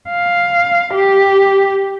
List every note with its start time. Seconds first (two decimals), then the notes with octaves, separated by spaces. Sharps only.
0.10 F5
0.94 G4